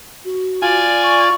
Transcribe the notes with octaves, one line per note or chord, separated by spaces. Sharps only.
F#4
F4 D5 G#5
C#6